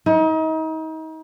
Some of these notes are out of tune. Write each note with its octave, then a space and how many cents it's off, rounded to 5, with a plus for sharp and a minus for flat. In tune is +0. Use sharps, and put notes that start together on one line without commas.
D#4 +35